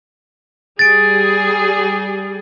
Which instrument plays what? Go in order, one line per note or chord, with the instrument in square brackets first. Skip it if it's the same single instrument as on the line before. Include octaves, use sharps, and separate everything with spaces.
[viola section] G3 G#4 [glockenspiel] A6 D7